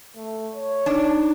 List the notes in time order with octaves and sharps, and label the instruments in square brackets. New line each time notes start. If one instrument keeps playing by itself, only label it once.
[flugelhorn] A3
C#5
[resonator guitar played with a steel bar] D4 [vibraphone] D#4